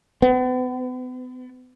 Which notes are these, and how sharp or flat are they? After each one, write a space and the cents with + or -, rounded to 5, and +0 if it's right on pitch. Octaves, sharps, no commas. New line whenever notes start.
B3 +40